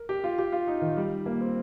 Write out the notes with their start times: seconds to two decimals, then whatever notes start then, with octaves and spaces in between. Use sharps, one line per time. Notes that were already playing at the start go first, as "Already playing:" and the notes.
Already playing: A#4
0.09 G4
0.24 F4
0.39 G4
0.52 F4
0.67 D#4
0.82 D#3
0.97 G3
1.26 A#3
1.41 C4